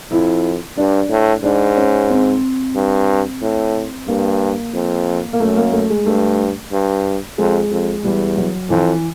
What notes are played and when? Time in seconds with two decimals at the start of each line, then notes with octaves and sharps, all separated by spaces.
0.11 F2 E4
0.77 G2 D4
1.10 A2
1.43 G#2 D4
1.77 C#4
2.10 C4
2.75 G2
3.42 A2
4.08 G2 A#3
4.74 F2
5.33 A#3
5.40 F#2 A3
5.57 A#3
5.73 A3
5.90 G#3
6.06 G2 A3
6.72 G2
7.38 F2 G#3
7.71 F2
8.04 E2 G3
8.37 F#3
8.70 F2 E3